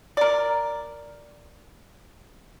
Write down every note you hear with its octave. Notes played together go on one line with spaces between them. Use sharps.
A#4 D5